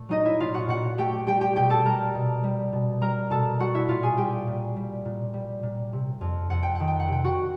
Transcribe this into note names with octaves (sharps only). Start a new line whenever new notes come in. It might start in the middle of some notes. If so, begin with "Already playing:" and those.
Already playing: A#2 A3
F#3 D#4 D#5
E4 E5
A#2 F4 F5
F#4 F#5
A#2 F#4 F#5
A3 G4 G5
G3 G4 G5
G4 G5
B2 G4 G5
A4 A5
G3 A#4 A#5
B2
G3
B2
G3 A#4 A#5
B2 A4 A5
G3 F#4 F#5
E4 E5
A#2 F4 F5
G#4 G#5
G3 G4 G5
A#2
G3
A#2
G3
A#2
C3
F2
F2 F#5
G5
D#3 F#5
G5
F#5
C3 G5
F#4 F#5